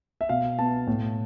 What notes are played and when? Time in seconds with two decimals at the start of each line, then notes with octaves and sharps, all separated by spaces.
0.21 E5
0.29 B2 F5
0.59 B3 A5
0.87 A2